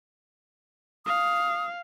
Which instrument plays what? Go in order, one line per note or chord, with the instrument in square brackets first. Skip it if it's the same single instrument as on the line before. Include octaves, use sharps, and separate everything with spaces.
[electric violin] F5 [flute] D#6